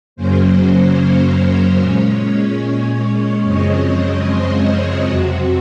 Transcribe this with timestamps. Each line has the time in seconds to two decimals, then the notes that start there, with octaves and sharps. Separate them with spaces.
0.16 F#2 C#3 F#3 A#3 C#4 C5
0.98 C#5
1.80 A#2 G#3 C#4
3.43 F#2 C#3 F3 G#3 C4 D#5
3.84 C#5
4.25 C5
4.66 G#4
5.06 F2 C3 F#3 C4 F#4